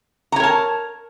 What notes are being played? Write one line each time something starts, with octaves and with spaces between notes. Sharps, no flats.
A#4 C#5 A5 A#5